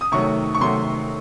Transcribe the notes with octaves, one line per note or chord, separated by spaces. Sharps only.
D#6
C3 D#3 F#3 A3 C#6
C#6
C3 D#3 F#3 A3 C6